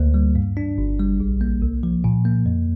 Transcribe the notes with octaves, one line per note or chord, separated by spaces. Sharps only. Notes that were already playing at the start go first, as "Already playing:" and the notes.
Already playing: D2 A#3
G3
G2
D4
G1
G3
A#1
A#3
C2
F3
A#2
A#3
F2